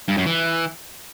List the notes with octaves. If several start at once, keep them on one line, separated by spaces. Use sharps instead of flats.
G2
F#2
E3